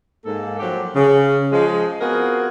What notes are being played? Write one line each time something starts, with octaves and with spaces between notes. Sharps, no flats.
G#2 A#3 A4
F3 F#3 G4
C#3
F3 G#3
B3 C4 F4 F#4 G#4 A#4